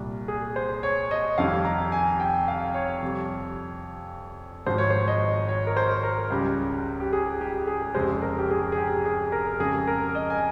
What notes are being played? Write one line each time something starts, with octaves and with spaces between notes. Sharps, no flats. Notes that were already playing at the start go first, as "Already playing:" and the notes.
Already playing: C2 A#2 G3
G#4
C5
C#5
D#5
F1 F2 D#3 G3 F5
A#5
G#5
G5
F5
C#5
F2 C3 G3
G#1 G#2 F3 C5
C#5
C5
D#5
C#5
A#4
C5
A#4
C#2 C#3 G3
G4
G#4
G4
G#4
F1 F2 C#3 G#3 C5
A#4
G4
G#4
G#4
G4
G#4
A#4
F2 C#3 G#3 G#4
A#4
D#5
G#5